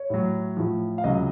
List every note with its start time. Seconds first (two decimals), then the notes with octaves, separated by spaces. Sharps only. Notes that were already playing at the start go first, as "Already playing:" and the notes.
Already playing: C#5
0.10 A2 F#3
0.57 A2 F3
0.98 F5
1.04 C#2 C3 F#3 D#5